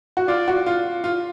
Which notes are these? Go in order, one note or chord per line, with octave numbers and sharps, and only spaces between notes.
F#4
F4 D5
F#4
F4
F4